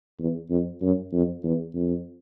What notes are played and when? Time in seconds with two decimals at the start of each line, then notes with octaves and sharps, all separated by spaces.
0.19 E2
0.50 F2
0.82 F#2
1.13 F2
1.43 E2
1.75 F2